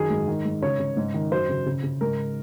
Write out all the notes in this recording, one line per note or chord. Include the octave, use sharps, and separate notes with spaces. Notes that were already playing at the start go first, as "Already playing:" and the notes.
Already playing: F#2 D#3 G#4
G#2
D#3
G#2
C#3 C#5
C#3
G#2
D#3
F#2 C5
C#3
C#3
C#3
G#2 A#4